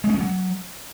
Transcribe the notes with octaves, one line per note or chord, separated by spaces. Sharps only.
G#3
C#4
G#3
F#3